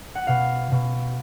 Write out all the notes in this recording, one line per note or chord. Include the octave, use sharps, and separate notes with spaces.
F#5
B2 F5
B2